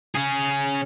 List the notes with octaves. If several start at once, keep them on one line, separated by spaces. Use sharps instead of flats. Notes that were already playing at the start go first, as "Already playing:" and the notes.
C#4 G#4